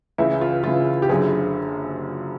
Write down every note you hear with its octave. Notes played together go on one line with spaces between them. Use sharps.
C#2 C#3 E3 E4
F4
C#2 C#3 E3 F4
G4
F#1 F#2 D3 G#4